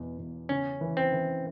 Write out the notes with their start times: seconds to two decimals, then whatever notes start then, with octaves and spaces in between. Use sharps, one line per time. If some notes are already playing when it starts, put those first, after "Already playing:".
Already playing: E2 B2
0.18 E2
0.49 C#3 C#4
0.81 E3
0.97 C4
1.12 E3